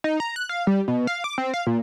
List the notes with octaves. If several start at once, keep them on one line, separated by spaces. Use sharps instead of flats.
D#4
A#5
F#6
F5
G3
B2
F5
D6
C4
F5
A#2